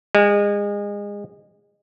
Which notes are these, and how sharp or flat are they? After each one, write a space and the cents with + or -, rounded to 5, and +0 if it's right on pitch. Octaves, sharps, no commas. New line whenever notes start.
G#3 -30